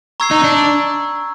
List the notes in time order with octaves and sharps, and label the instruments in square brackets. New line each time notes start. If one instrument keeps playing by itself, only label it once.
[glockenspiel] A#5 C#6 E6 G#6 C7
[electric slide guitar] D#4
D4